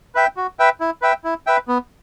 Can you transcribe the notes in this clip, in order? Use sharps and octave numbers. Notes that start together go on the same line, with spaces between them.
B4 E5 G5
F#4
B4 E5 G5
E4
B4 E5 G5
E4
B4 E5 G5
B3